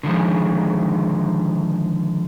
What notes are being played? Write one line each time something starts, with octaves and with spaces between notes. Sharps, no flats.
D3 D#3 F3 G#3